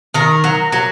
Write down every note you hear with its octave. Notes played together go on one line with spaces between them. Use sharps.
D#3 A#4
F#3
F#3